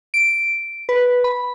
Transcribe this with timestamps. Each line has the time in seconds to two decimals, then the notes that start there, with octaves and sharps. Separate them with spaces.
0.14 D7
0.89 B4
1.24 B5